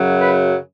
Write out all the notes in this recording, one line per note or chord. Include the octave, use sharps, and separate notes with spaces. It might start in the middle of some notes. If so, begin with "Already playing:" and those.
Already playing: F#2 C#3 F#3
B4